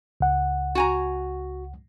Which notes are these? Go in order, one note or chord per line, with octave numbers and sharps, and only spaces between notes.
C#2 F#5
F#4 G#5 A#5